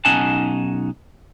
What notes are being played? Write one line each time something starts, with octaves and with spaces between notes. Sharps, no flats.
B1 C#4 D#4 F#5 G#5 A5